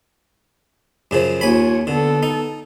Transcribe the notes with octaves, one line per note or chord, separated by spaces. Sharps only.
F#2 C#3 F3
D#2 F4 C#5 G#5 B5
D3 B3 A4
D#4